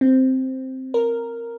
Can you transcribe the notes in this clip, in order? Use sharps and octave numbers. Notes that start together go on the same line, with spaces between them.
C4
A#4